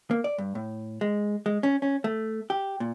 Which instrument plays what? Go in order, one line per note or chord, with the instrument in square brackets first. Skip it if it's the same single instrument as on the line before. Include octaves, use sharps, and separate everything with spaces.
[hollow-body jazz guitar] A#3
D5
G2
A2
G#3
G#3
C#4
C#4
A3
G4
A#2